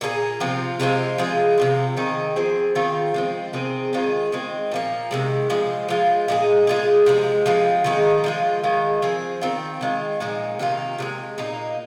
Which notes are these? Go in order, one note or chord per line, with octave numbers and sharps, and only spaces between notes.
A#2 A#3 D#4 G#4
C3 F3 C4 F4
C3 G#3 C4 F4
F3 G#3 F4 G#4
C3 F3 C4
D#3 C4 D#4 G#4
F3 C4 G#4
D#3 C4 F4 G#4
F3 G#3 C4
C3 D#3 C4 G#4
D#3 G#3 F4 G#4
D#3 G#3 C4
A#2 F3 A#3
C3 D#3 G#3
A#2 F3 G#3
F3 G#3 F4
A#2 G#3 D#4 G#4
G#3 F4 G#4
C3 F3 G#3
F3 G#3 C4 F4
D#3 G#3 D#4 G#4
F3 G#3 F4
D#3 G#3 F4
F3 C4 G#4
D#3 C4 F4
D#3 G#3 F4
A#2 F3 G#3 D#4
C3 D#3 A#3 F4
C3 F3 G#3
A#2 A#3 D#4